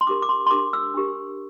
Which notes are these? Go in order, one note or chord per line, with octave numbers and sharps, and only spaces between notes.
C6
D4 G4 A#4 D6
D6
C6
C6
D4 G4 A#4 D6
E6
D4 G4 A#4